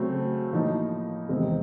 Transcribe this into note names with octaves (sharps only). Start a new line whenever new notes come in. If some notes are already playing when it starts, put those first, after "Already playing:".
Already playing: C#3 F#3 A3 C4
A2 F3 A#3 D#4
E2 C3 D#3 G#3 C4